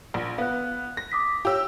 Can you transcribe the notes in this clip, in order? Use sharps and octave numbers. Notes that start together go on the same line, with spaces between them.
A#1
B3 F5 F#6
A#6
D6 D#6 B6
G4 C#5 F5 E6